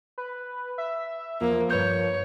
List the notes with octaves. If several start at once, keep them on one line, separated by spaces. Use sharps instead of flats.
B4
E5
E2 F3 A#3
G2 B4 C#5 G6